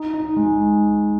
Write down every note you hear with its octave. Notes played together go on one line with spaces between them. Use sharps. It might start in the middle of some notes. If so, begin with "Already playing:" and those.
Already playing: D#4
D#4
G#3